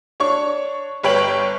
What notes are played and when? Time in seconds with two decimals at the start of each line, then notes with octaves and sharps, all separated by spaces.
0.20 D4 C#5 C#6
1.03 G1 B4 C#5 G5 D7 F#7